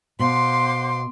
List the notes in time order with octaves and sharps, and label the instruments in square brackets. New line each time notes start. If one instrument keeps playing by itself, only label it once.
[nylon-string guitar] B2 [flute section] C5 F5 F#5 [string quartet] C6 D6